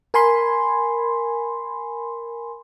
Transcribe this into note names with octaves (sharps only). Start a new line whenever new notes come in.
A#4 G#5 B5 C6